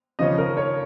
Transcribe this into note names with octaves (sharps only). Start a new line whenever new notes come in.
C#3 F3 C#4 D#5
A#4
C#5